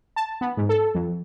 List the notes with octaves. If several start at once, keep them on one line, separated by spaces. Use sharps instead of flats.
A5
B3
G#2
A4
F2